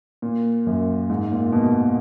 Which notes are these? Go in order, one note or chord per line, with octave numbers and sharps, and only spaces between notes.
A#2
F#2
G#2
A#2
B2